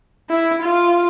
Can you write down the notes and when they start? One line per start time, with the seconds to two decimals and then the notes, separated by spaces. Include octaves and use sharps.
0.30 E4
0.62 F4